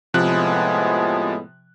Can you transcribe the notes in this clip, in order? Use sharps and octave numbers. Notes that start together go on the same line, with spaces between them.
A2 C3 F3 G#3 B3 F#6